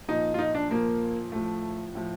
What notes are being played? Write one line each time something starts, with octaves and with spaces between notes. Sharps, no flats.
A#2 F3 D#4
F4
D#4
D4
A#2 F3 A#3
A2 F3 A3
A2 F3